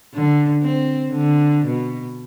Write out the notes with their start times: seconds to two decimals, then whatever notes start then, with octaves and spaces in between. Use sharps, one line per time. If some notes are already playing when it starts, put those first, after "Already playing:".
0.14 D3
0.62 C4
1.10 D3
1.66 B2